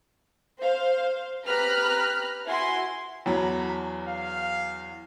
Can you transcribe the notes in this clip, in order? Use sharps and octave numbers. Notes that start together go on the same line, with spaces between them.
C5 F5
G4 B4 A#5 B5 F6 F#6
E4 F#4 G#5 C6
E2 F#3 A4 A#5 B5
F5